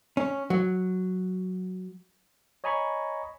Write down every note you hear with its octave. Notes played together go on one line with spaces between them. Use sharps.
C#4
F#3
C#5 D#5 G#5 A#5 B5 C#6